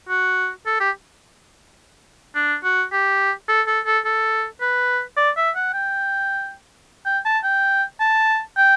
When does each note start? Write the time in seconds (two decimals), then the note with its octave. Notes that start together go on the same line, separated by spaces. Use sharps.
0.09 F#4
0.66 A4
0.80 G4
2.35 D4
2.63 F#4
2.92 G4
3.48 A4
3.67 A4
3.85 A4
4.05 A4
4.61 B4
5.17 D5
5.37 E5
5.56 F#5
5.73 G5
7.06 G5
7.25 A5
7.44 G5
8.00 A5
8.57 G5